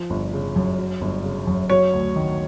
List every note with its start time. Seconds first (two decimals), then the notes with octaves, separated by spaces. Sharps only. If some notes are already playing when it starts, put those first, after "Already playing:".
Already playing: F3
0.10 G1
0.33 C#3
0.56 F#2
0.78 F#3
1.01 G1
1.24 C#3
1.47 F#2
1.70 F#3 C#5
1.93 D2
2.16 D#3